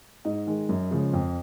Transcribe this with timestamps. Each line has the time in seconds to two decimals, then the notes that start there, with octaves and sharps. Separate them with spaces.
0.25 G#2 D#5
0.47 D#3 G#3
0.69 F#2
0.91 C#3 F3 G#3
1.14 F2